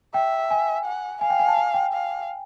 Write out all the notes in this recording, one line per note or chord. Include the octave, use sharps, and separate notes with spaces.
E5 G5
G#5
F#5
F5 G#5
G5
G#5
A5
G#5
G5
F5